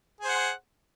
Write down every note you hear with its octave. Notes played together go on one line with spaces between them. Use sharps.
G#4 C5 F#5